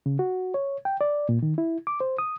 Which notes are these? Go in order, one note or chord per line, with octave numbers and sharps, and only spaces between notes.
C#3
F#4
C#5
G5
D5
A#2
D#3
E4
D6
C5
D#6